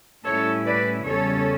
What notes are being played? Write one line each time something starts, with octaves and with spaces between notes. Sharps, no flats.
A2 G3 C#4 E4 A4 C#5
B4 D5
E2 C#3 G3 C#4 A4 C#5